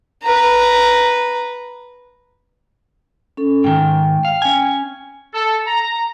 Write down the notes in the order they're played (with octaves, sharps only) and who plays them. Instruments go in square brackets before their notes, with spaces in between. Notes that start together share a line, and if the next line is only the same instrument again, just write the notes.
[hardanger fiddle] B4 A#5
[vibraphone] C#4 A4
[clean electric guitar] G#2 D#3 [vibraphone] G5
[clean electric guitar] F5
C#4 G#5
[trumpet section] A4
A#5